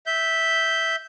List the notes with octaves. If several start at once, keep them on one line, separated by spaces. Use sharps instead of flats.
E5 G6